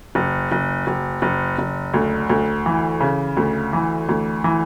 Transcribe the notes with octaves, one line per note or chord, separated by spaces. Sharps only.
F#1
F#1
F#1
F#1
F#1
D2
D2
E3
C#3
D2
E3
D2
E3